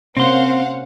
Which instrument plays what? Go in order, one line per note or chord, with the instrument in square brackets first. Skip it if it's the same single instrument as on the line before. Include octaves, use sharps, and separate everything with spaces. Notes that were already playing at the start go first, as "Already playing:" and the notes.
[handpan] C3 A#3 C#4 [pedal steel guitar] C4 C6 [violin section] C5 F5 F#5